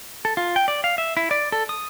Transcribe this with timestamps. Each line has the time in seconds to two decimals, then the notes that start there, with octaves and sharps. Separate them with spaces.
0.25 A4
0.37 F4
0.56 G5
0.68 D5
0.84 F5
0.98 E5
1.17 E4
1.31 D5
1.52 A4
1.69 D#6